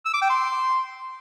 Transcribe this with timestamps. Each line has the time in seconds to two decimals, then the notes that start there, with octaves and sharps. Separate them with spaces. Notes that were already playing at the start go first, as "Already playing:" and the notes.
0.05 E6
0.13 D6
0.22 G5
0.30 C6